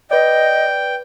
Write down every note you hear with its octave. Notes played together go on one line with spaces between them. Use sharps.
B4 D5 D#5 G5